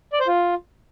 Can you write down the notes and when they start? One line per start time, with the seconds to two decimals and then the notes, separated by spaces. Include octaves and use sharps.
0.13 D5
0.20 C5
0.27 F4